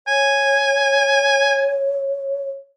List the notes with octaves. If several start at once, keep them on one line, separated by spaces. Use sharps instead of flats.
C#5 G#5